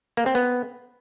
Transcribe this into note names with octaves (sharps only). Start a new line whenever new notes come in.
A#3
C4
B3